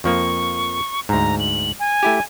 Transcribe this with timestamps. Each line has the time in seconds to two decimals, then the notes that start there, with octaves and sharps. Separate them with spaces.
0.04 F2 F3 A#3 C#6
1.09 D2 G#2 A#5
1.39 F#7
1.79 G#5
2.03 A3 E4 G4